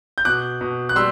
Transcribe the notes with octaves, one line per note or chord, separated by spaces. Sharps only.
G6
B2 D6 F#6
B2
F#6
G3 C6 E6